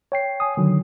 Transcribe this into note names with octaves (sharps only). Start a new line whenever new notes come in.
C#5 G5 C7
G#5 D#6
D3 D#3 F#3